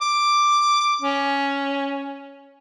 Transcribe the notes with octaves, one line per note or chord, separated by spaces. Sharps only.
D6
C#4